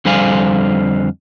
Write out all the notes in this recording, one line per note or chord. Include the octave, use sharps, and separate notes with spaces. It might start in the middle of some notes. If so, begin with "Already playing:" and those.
F2 D3 G3 C5 F5 G#5